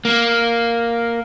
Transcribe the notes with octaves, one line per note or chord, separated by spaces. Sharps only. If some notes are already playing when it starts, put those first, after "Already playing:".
A#3